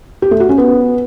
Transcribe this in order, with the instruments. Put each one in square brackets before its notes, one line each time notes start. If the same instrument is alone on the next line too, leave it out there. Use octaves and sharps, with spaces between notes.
[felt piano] G4
A3
F#4
C#4
B3